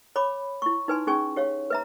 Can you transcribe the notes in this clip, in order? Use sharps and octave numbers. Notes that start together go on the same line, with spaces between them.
C#5 B5 D6
E4 C#6
D#4 B4 G#5 C6
C#4 D#4 G#4 G#5 C#6
G4 C#5 F5
B4 E5 A#5